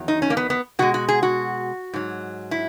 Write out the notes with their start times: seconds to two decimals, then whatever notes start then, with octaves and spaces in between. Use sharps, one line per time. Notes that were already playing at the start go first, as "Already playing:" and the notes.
Already playing: E2 D#3 F#3
0.08 D#4
0.22 C#4
0.30 A#3
0.37 B3
0.50 B3
0.79 B2 G#3 F#4
0.94 F#4
1.08 G#4
1.23 F#4
1.93 G#2 F#3
2.51 E4